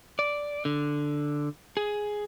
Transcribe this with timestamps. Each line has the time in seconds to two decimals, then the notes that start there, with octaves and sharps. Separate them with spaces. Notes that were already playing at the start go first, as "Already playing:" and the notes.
0.19 D5
0.65 D3
1.77 G#4